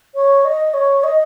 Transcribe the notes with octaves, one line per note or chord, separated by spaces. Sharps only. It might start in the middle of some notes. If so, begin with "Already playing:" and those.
C#5
D#5
C#5
D#5